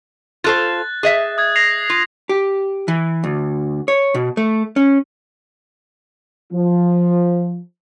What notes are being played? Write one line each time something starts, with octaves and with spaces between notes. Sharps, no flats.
F4 A4 C5 F#6 A6
G#4 D#5 E5
D#6 G#6
A#6 C7 F7
F4
G4
E3
D2
C#5
B2
A3
C#4
F3